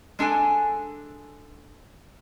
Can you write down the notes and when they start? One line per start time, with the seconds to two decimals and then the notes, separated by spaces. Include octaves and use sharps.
0.19 G#3 D4 A4 G#5